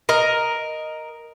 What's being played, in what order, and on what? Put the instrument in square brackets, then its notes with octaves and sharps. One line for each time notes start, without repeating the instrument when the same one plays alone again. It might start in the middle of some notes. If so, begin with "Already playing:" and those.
[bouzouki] A#4 D#5